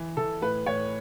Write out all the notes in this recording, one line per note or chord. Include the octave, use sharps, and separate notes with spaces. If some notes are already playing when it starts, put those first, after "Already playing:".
Already playing: E3
E3 A4
A2 B4
A2 C#5